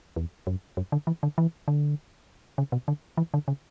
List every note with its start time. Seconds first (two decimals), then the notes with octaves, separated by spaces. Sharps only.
0.16 E2
0.47 F#2
0.77 F#2
0.92 D3
1.07 E3
1.23 D3
1.38 E3
1.68 D3
2.58 C#3
2.72 B2
2.88 D3
3.17 E3
3.34 D3
3.48 C#3